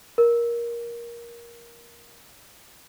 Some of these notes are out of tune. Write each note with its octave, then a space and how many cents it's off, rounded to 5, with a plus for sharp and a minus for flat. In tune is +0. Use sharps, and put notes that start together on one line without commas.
A#4 +15